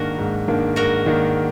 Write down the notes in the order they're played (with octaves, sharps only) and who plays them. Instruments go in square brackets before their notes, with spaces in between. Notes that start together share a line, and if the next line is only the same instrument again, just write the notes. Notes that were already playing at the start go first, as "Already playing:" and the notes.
Already playing: [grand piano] G#2 D#3 A#3 D4 [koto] F#4 A#4
[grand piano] G#2
D#3 A#3 D4
[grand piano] G#2 [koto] F#4 A#4
[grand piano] D#3 A#3 D4